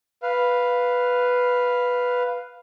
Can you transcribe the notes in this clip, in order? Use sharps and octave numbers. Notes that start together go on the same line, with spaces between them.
B4 F5